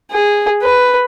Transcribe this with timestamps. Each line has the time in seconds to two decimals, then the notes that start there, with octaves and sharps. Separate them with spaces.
0.12 G#4
0.63 B4